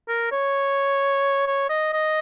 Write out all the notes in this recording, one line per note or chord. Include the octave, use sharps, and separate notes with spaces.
A#4
C#5
C#5
D#5
D#5